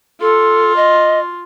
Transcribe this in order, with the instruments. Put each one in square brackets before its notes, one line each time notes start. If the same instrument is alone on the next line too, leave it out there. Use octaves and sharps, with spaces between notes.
[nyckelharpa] F4 [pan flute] A4
[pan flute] D#5